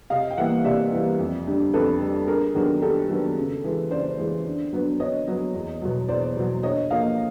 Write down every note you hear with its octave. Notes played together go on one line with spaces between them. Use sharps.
C3 D#5 F5
G5
E3 G3 A#3 E5 F#5
C3 D5 E5
E3 G3 A#3
F2
D3 G3
F2 A4 B4
D3 G3
G2 G#4 A#4
D#3 F#3 B3 D4 F#4 G#4
G2 G4 A4
D#3 F#3 B3 D4
C#3
E3 G#3
C#3 C5 D5
E3 G#3
D3
F#3 B3 D4
D3 C#5 D#5
F#3 B3 D4
E2
B2 F#3
E2 C5 D5
B2 F#3
D3 C#5 D#5
F3 A#3 D#5 F5